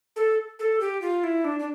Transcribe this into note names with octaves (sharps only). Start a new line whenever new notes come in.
A4
A4
G4
F4
E4
D4
D4